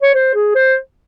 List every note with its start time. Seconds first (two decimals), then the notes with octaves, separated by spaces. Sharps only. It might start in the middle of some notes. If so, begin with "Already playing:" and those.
0.02 C#5
0.15 C5
0.34 G#4
0.55 C5